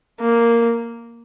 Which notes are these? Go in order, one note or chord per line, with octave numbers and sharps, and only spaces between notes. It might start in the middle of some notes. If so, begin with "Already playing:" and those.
A#3